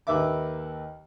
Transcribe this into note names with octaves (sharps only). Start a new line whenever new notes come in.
D#2 A#3 B4 E5 D6